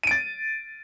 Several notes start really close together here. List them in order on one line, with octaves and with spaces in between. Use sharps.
D#7 D7 A6